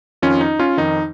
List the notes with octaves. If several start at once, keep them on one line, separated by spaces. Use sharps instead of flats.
F2 D#3 C#4 F4
D#4
C#4 F4
F2 D#3 D#4